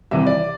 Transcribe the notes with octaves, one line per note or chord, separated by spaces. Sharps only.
C2 C3 E3 E5
D5